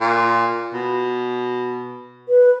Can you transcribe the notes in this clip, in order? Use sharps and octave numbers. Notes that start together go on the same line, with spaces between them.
A#2
B2
B4